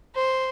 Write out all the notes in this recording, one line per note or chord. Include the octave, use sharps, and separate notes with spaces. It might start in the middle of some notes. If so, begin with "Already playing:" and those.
C5